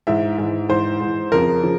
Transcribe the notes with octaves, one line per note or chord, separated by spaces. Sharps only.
G#2 E3 E5
G#2 E3
G#2 E3 C5
G#2 E3
F2 C#3 F3 A#4
C#3 F3